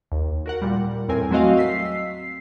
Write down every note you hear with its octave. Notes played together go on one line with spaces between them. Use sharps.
D#2
F#4 A#4 F#5
A#2 G3
E2 A2 C4 A#4 G#5
F#3 A3 C4 F#4 D#5 F5
E6 B6 C7